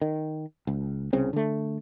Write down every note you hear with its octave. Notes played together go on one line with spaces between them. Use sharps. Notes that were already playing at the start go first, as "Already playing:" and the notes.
D#3
C#2
C2 C#3 C4
D3 A3